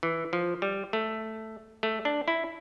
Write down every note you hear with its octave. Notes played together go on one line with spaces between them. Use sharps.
E3
F3
G3
A3
A3
D4
E4